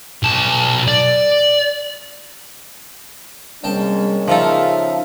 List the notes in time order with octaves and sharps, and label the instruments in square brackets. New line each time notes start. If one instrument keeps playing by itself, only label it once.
[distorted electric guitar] B1 A5
D5
[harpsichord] C2 G5 A5 [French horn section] G#3 A#3 C#4
[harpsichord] C#3 D#4 F4 [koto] F3 A4 [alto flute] E5